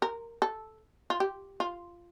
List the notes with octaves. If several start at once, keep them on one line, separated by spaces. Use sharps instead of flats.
A#4
A4
F4
G4
F4